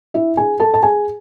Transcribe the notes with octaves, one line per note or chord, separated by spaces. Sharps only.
E4 E5
G#4 G#5
A4 A5
A5
G#4 G#5